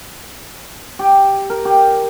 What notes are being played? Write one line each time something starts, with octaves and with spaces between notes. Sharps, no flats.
G4
A#4
G4